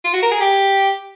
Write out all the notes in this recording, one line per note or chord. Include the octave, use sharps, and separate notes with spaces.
F4
F#4
A#4
G#4
G4